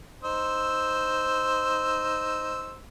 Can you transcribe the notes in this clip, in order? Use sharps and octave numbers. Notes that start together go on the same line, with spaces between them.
D#4 C5 E6